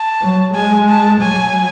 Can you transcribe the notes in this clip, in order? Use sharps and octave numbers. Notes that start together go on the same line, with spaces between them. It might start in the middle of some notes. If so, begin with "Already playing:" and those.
Already playing: A5
F#3
G#3 G#5
A5
F#3 G#5